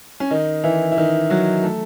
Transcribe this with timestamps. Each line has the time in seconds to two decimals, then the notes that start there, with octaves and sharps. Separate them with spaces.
0.20 C#4
0.31 D#3 D#4
0.64 E3 E4
0.92 E4
0.97 D#3 D#4
1.30 F#3 F#4
1.63 A3 A4